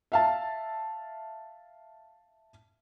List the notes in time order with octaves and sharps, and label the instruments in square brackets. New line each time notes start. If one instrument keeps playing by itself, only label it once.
[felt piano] E5 F5 A5